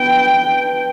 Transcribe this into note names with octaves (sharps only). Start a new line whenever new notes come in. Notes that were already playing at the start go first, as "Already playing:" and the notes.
Already playing: B3 D4 B4 G5